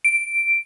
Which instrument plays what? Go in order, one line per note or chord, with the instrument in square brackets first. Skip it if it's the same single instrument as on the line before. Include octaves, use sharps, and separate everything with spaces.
[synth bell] D7